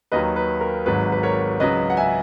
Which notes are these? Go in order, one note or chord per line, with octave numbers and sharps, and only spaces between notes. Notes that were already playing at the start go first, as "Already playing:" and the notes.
D#2 D#3 F#3 B4 D#5
B4
A#4
G#1 G#2 F#3 B4
B4
A#4 C#5
C#2 C#3 F#3 B4 D#5
F#5
E5 G#5